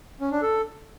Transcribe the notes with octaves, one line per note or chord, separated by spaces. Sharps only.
C#4
D4
A4